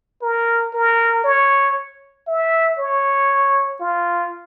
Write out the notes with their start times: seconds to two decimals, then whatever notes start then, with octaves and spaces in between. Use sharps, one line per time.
0.22 A#4
0.74 A#4
1.24 C#5
2.27 E5
2.78 C#5
3.80 F4